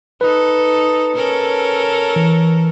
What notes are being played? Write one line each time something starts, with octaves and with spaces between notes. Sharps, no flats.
D#4 A4 B4
C#4 A4 A#4
E3